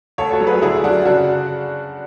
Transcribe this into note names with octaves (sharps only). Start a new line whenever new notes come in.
D2 A4 C#5
F#4 A4
F#3
G#4 B4
D3 E4 G#4
F#2 D4 F#4
C#3 D4 F#4